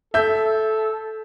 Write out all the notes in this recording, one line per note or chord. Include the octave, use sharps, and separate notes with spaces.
A4 E5 G6